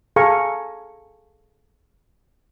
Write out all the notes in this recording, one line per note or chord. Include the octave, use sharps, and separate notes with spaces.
G#4 A4 F5 G#5 A#5 C#6